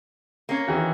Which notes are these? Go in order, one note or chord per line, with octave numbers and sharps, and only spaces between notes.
A#3 C#4
D#3 E3 F#4